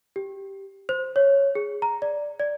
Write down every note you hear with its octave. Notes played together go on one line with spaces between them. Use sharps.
G4
C5
C#5
G#4
A#5
D5
D5